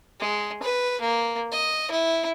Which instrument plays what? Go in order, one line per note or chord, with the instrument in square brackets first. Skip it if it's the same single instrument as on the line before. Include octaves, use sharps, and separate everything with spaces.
[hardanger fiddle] G#3
B4
A#3
D#5
E4